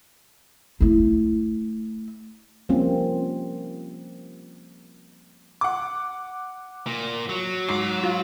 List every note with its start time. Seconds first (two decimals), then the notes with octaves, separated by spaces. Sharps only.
0.80 A3 E4
2.69 F3 G3 A#3 C4 C#4 F4
5.61 F#5 D6
6.87 A#2
7.29 F#3
7.69 G#2 D6 C7
8.04 F4